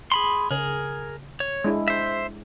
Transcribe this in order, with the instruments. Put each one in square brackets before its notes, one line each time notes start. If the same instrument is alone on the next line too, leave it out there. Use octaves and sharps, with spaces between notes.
[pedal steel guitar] G#4 B5 C6
[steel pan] C#3 [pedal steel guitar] G#4 A#4
[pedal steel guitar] C#5
[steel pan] G#3 D4 E4
[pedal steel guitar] C5 E5